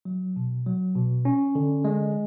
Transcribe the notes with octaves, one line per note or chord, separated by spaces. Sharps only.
F#3
B2
F#3
B2
C#4
D3
G#3